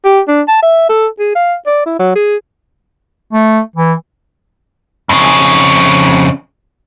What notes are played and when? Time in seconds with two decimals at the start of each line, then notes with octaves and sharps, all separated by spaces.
0.05 G4
0.28 D4
0.48 A5
0.63 E5
0.89 A4
1.19 G#4
1.36 F5
1.67 D5
1.86 E4
1.99 F#3
2.16 G#4
3.33 A3
3.76 E3
5.09 F2 C#3